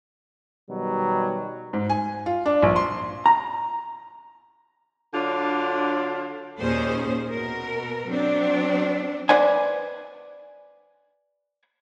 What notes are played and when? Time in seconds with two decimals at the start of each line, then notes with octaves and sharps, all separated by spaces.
0.69 B2 D#3 F#3 G3
1.73 G#2
1.89 G#5
2.26 F4
2.46 D4
2.63 A#1
2.76 C6
3.26 A#5
5.14 D3 F#3 D4 F4
6.60 D#2 A#2 C#4 G#4 C5
7.32 B2 A#4
8.08 F#3 C4 D4
9.29 B4 C5 D5 F#5 G#5